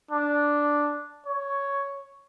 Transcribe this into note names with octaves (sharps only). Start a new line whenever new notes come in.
D4
C#5